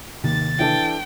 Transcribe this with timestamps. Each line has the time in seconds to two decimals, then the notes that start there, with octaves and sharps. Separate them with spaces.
0.24 D#2 C3 D#3 A#3 A6
0.59 E3 D4 A4 G5